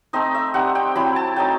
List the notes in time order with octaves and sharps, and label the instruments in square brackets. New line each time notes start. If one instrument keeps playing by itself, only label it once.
[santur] A3 C4 D#4 D#5
E5
G3 C4 D#4 F#5
G5
F#3 C4 E4 B5
A5
F#3 A3 D#4 G5